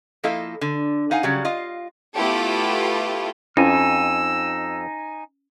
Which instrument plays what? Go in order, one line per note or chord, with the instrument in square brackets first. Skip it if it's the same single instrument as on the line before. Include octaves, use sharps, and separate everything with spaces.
[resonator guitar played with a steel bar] F3 A#3 E4 A4 D#5 F5
D3
D#4 F5 F#5 G#5
C#3 F#3 G3
F4 D#5 F5
[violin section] A3 B3 E4 F4 G4 A4
[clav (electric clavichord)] F2 [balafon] C#4 E4 [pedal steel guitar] D#4 G#5 [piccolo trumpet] E6